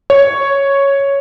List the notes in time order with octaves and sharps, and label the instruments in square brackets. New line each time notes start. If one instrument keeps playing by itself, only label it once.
[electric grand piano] C#5